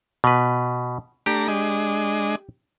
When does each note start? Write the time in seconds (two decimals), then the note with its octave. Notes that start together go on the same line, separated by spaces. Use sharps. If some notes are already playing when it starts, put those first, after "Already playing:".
0.24 B2 B4
1.26 A3 D4 G4 A#5
1.48 G#3 D4 D#5